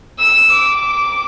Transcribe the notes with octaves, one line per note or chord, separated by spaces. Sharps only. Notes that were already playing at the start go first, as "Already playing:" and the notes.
E6
D6